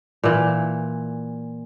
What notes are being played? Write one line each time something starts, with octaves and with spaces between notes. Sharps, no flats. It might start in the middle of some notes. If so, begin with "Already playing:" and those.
A#2 E3